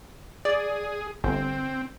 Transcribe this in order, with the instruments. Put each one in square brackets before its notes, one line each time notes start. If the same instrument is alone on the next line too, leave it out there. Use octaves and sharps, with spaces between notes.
[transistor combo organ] G#4 [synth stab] D5
[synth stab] G1 [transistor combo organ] C4